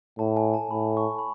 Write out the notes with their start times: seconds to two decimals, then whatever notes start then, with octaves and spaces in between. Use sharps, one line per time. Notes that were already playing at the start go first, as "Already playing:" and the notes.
0.19 A2 A5
0.37 G#5
0.54 A5
0.71 A2 B5
0.97 C#6
1.18 B5